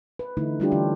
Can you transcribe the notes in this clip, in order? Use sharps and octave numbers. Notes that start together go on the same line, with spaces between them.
B4
D3 E3 A3 D#4 E4
G3 C#4 D4 E4 F4 G4
D3 E3 A3 C#4 G4